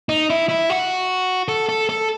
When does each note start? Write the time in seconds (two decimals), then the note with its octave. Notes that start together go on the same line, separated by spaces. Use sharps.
0.09 D#4
0.30 E4
0.49 E4
0.70 F#4
1.48 A4
1.69 A4
1.89 A4